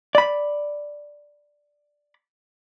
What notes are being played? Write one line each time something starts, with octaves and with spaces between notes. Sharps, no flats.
D5 B5